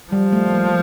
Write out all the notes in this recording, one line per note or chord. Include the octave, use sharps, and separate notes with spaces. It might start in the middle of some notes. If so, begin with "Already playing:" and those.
F3 G3
A3
A#3